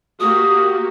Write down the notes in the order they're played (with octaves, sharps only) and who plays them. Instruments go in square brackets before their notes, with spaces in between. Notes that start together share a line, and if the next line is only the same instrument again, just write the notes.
[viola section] A#3 F#4 G4 [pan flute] D#6